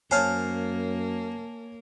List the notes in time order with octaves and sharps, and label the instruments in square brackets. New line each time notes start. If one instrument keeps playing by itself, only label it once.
[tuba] F#2 [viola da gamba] A#3 [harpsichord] C5 F5 [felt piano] C#5 G#5 A5